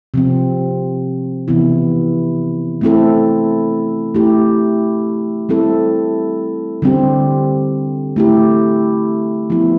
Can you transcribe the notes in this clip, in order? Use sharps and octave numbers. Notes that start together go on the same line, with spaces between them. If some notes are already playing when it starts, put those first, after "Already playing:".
C3 F3 C4
C3 E3 B3 E4
A3 C4 E4 A4
A3 E4 G4
G3 C4 E4 A4
D3 G3 C4 G4
A3 E4 G4
F3 B3 E4